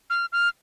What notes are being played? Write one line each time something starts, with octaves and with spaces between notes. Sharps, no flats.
F6
F6